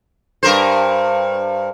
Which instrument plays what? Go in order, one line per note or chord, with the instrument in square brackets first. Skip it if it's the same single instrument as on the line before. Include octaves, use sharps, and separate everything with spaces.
[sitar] G2 A#4 C5